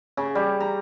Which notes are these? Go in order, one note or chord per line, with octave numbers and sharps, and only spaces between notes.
C#3
G3
A#5